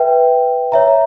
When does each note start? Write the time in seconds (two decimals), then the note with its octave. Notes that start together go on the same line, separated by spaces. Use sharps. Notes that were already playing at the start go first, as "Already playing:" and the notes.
Already playing: B4 E5 G5
0.72 C#5 E5 A#5